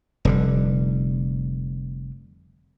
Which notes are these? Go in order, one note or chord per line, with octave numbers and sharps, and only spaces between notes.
F1 D3 G3